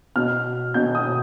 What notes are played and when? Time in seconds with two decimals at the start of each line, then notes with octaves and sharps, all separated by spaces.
0.16 B2 F6
0.74 B2 G6
0.95 D#6